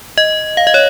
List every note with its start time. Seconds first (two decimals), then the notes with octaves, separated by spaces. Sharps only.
0.18 D#5
0.57 F5
0.67 D#5
0.74 C#5